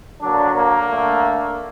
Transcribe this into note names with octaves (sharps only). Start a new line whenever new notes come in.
D3 F#3 A#3 D4
A#3
D3 A3